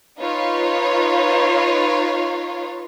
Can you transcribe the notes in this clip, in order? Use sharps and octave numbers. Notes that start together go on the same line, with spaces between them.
D#4 F4 B4 C#5